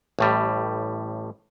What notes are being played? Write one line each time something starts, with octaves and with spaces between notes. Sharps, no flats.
A1 A2 G3